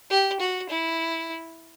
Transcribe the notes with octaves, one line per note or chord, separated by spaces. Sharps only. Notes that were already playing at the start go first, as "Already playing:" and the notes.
G4
F#4
E4